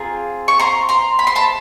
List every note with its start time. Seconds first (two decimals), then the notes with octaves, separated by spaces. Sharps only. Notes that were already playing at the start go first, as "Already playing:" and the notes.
Already playing: C4 F4 G#4 A#5
0.48 C#6
0.59 A#5 C6
0.89 A#5 C6
1.19 B5
1.27 C6
1.35 A5 B5